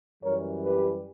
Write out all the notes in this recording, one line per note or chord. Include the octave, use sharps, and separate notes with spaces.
F#2 E3 G3 A#4 C#5
G4 B4